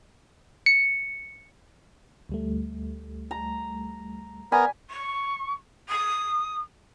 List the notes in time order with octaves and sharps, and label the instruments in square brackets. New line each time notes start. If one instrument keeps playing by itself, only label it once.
[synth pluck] C#7
[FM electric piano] D2 G3 A3
[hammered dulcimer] A#5
[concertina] B3 A#4 [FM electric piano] D5 B5 [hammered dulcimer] G#5
[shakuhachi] C#6
D#6